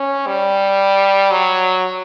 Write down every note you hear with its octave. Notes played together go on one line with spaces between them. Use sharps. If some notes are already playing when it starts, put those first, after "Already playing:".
Already playing: C#4
G3
F#3